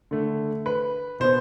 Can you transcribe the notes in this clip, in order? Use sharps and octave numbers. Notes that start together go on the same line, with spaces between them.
D3 A3
B4
B2 B3 C5